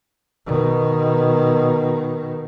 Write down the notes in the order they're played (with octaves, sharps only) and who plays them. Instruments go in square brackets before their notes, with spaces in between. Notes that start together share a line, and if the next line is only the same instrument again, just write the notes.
[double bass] B2 D#3